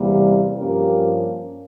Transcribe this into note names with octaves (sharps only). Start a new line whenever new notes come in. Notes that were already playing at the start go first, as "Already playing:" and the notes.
Already playing: E2 C3 G3 A#3
G2 F3 A#3 C#4 G4 A#4